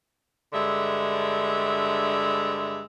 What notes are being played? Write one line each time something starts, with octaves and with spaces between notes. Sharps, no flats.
G2 D3 G#3 E5